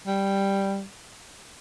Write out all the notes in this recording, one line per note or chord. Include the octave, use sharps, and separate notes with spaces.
G3